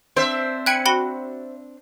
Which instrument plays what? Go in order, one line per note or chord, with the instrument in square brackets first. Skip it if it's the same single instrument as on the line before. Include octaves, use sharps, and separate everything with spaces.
[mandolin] C4 D4 [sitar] C5 E5
[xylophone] G5 F#6 [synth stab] G#5 B5 C#7
[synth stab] F#4 F#5 [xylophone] G5 B5 G7